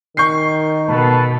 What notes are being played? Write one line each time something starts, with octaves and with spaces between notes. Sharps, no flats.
D#3 C#6 G6 C7
B2 A4 B4 A5